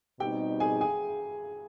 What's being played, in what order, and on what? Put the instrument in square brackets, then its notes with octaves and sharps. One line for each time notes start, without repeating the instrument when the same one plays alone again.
[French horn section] B2 G3 C4 D#4 [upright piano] G4 G5
[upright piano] G#4 G#5
G#4 G#5